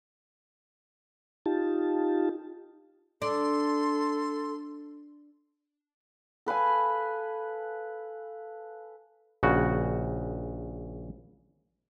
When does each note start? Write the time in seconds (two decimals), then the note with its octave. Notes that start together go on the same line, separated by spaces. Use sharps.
1.46 D#4 F4 G4 A5
3.22 D4 A4 C6
6.46 A4 B4 F5 G#5
9.43 A#1 C#3 F#4